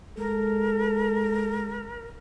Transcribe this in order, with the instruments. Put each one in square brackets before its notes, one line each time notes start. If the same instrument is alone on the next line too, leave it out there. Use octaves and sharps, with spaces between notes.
[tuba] G#3 [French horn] A4 [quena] A#4